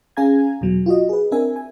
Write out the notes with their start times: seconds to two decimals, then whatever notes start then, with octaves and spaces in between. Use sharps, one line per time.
0.17 C#4 G#4 F5 G#5 A#5 G#6
0.61 E2 B2 F#3
0.86 F4 F#4 D#5
1.09 G#4 B4
1.32 C4 D4 A#4 E5 G#5
1.56 G#5